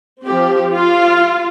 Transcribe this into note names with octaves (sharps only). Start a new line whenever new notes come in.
F3 C4 G4
F4